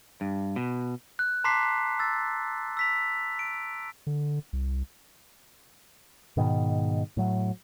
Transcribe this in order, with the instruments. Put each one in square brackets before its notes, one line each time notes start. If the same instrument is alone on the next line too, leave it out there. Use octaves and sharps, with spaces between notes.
[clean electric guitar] G2
B2
[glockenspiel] F#6
A5 A#5 C6 D6 B6 C7
E6 A6
E6 B6 F7
D7
[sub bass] D3
C2
[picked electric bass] G#2 B2 D#3
A2 F#3